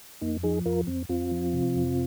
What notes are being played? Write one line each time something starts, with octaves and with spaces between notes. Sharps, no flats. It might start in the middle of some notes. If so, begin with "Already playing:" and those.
F2 A#3 D#4
F3 D#4 G#4
F2 F4 A#4
F2 C4
F2 C4 F4
F3
C3
F2